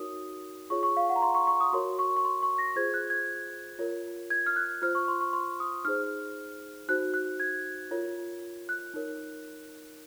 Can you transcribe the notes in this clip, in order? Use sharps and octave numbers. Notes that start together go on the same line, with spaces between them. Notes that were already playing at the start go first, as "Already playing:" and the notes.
Already playing: D#4 F#4 A#4 C#5 D#6
F4 G#4 C#5 C#6
C#6
F5
F#5
A#5
C6
C#6
C#6
D#6
F#4 A#4 C#5 C6
C#6
C#6
C6
C#6
A#6
F4 G#4 C5 G#6
F#6
G#6
F4 A#4 C#5
G#6
F6
F#6
F4 C5 F6
C#6
C6
C#6
C6
D#6
D#4 G#4 C5 F6
D#4 F#4 C5 F#6
F#6
G#6
F4 A#4 C#5
F#6
D#4 A#4 C#5